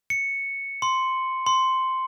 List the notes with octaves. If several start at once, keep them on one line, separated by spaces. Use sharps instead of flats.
C#7
C6
C6